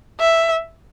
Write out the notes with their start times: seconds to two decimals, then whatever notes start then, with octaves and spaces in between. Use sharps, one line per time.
0.20 E5